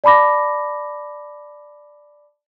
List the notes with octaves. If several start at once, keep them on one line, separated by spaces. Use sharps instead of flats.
D5 A5 B5 D6 A#6